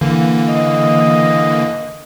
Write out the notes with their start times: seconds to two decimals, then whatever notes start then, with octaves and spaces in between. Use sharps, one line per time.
0.01 D3 E3 A#3
0.48 D#5